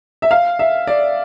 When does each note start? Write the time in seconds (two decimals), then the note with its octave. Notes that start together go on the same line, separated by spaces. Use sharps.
0.22 E5
0.31 F5
0.59 E5
0.87 D5